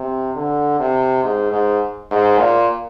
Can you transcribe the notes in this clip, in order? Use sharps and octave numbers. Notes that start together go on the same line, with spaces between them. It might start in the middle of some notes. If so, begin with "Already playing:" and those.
Already playing: C3
D3
C3
G#2
G#2
G#2
A#2